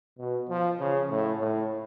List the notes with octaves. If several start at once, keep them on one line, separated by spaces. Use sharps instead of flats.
B2
F3
C#3
A2
A2